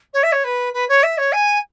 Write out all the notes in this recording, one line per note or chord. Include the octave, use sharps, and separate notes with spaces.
C#5
E5
C#5
B4
B4
C#5
E5
C#5
G#5